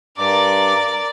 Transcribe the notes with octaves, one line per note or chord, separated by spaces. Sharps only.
G2 A#4 D5 D6